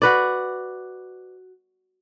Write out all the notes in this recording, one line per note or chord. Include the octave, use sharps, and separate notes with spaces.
F#4 B4 D5